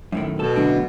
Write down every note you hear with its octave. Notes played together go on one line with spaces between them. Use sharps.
F#2 A2 D#3
B2 A4 A5
F#2 A2 D3